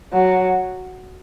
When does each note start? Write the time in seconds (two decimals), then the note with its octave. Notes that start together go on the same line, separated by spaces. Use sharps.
0.13 F#3